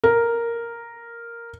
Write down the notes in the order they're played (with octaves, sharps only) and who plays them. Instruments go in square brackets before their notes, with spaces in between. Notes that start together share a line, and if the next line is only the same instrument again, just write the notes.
[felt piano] A#4